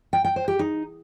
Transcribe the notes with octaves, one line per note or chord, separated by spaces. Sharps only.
G5
G5
C5
G4
D#4